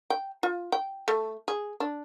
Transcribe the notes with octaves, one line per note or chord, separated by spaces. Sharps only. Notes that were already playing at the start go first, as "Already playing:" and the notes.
G5
F4
G5
A3
G#4
D4